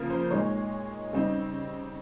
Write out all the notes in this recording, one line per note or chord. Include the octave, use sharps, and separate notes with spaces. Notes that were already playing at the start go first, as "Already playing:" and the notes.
Already playing: C#3 F3 A#3
C5
A#2 G#3 D#4 C#5
C#3 G3 C4 D#4